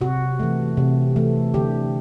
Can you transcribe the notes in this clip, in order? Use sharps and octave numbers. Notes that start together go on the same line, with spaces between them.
C3 F#4
E3 A3
C3
E3 A3
D3 G4